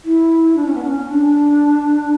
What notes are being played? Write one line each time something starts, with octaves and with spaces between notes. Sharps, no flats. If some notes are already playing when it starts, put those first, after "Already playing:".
E4
D4
C#4
B3
D4
C#4
D4